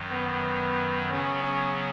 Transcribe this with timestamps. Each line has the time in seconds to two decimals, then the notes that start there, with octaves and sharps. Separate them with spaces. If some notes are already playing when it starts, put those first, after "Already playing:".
Already playing: F#2 D#3 F#3
0.12 B3
1.10 C#3 F#3 B3 C#4
1.43 C#4